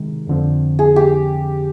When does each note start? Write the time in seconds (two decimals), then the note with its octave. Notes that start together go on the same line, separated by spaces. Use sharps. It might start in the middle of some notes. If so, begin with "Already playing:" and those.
Already playing: C3 D#3 G#3
0.27 F2 D3 F3 C4
0.79 G#4
0.96 G4